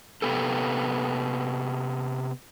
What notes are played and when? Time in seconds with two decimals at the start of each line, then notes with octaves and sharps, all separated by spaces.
0.22 C3 B3 G4 A4